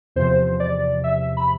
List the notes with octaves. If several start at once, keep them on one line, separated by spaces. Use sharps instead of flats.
E2 C3 F3 C5
D5
E5
B5